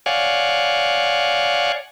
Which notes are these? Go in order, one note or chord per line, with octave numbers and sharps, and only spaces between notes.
C#5 D5 F5 F#5 G#5